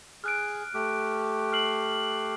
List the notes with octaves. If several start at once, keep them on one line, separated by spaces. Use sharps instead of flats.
G#4 F6 F#6 D7
A3 G4
F6 C7 F#7